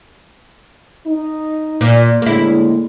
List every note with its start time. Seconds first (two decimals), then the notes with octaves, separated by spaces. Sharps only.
1.07 D#4
1.81 A#2
2.22 A2 D3 G#3 A#3 E4